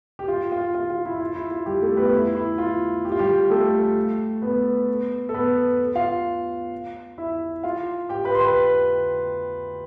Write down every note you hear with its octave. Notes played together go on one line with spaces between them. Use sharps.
G4
F4
F4
F4
F4
E4
F4
E4
F4
G3 G4
A3 A4
B3 B4
E4
E4
F4
G4
F4
G3 G4
A3 A4
B3 B4
A4
B3 B4
F4 F5
E4 E5
F4 F5
G4 G5
B4 B5
C6
B4 B5